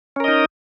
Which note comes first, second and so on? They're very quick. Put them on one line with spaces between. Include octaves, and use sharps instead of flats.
C#4 A#4 D#5 D#4